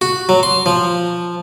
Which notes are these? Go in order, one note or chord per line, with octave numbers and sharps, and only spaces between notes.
F#4
F#3
C6
F3